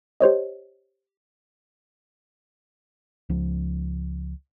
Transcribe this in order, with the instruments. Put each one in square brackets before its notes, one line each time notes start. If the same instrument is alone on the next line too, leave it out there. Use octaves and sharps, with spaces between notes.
[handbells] G4 C5 C#5 D#5
[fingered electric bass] C#2 F3